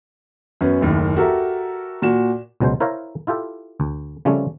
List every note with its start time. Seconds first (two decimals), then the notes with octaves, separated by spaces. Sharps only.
0.61 F#2 B3 C#4
0.81 F#1 D#2 A2
1.17 F#4 G4 A4 A#4 E5
2.02 A#2 F#4 E7
2.60 C#2 B2 F#3 G#3 C5
2.80 E4 A#4 C5 C#5 F5 A#5
3.27 E4 F4 G4 A4
3.80 D2
4.25 C#3 F3 G3 A3 C4 C#4